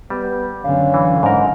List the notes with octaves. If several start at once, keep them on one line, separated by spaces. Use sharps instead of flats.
G3 B3
F#2 D3 C#4 F5
E3
G#2 A#4